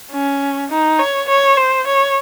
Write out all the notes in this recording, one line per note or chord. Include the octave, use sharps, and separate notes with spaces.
C#4
D#4
C#5
C#5
C5
C#5